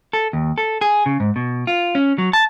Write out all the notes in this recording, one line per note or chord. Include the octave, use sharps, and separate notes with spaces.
A4
D#2
A4
G#4
C#3
G#2
B2
F4
C#4
F#3
A5